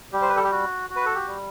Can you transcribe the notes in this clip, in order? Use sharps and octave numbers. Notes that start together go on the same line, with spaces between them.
G3 G4
C5
B4
A4
G4
F#4
F#4
B4
A4
G4
G3